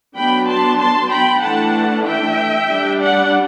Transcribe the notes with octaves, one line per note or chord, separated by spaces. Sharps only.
F#3 B3 D4 G5 B5
A5 C6
A5 C6
G5 B5
E3 A3 D4 F#5 A5
E5 G5
G3 D4
D5 F#5